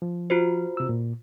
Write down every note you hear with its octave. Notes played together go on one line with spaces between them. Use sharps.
F3
F4 F#4 C5
C3 E6
A#2